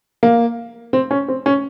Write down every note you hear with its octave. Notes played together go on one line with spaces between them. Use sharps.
A#3
C4
C#4
C4
C#4